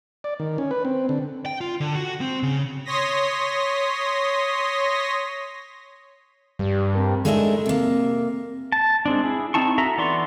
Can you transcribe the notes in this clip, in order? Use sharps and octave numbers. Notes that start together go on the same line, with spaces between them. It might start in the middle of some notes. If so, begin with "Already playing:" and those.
D5
D#3
C#4
B4
C4
D3
G5
F4
D3
F#4
C4
C#3
C#5 C6 D#6 A#6 B6
G2 G3
C4 A#4
G#3 A3 D4 D#4 A#4 E5
C3 A#3
A5
G#3 C4 D4
E4 G#4
C4 D#4 E4 A5 C#6
F#4 A4 E5 A#5
E3 B3 D5 C6 C#6